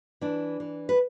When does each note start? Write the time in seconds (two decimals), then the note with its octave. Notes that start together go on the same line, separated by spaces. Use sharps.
0.21 E3 D4
0.60 E3
0.89 B4